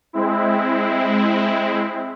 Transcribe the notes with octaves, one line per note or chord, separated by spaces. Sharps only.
G#3 C4 E4